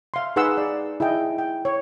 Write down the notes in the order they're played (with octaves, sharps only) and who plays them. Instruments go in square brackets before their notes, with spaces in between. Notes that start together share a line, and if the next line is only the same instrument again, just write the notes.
[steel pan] E5 F5 C6
D#4 G#4 B4 F#5 C6 E6
D5
E4 G#4 D#5 G5
G5
C#5